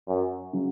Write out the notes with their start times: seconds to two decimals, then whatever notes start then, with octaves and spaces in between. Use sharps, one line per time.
0.08 F#2
0.53 C#3 F#3